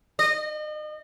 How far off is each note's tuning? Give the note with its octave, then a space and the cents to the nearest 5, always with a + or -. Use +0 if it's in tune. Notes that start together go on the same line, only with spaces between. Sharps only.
D#5 -35